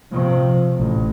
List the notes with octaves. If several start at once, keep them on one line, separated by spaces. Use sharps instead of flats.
C3 F3
A1